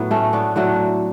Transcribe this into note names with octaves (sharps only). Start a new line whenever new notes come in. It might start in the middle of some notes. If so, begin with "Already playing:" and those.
Already playing: A2 F#3 B3
A3 C#4
B3 D4
A2 F#3 A3 D4 F#4